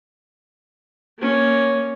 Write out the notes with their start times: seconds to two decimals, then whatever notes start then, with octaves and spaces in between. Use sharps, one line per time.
1.20 A#3 C#4